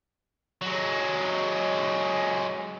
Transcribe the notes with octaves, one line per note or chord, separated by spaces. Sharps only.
F#3 G#3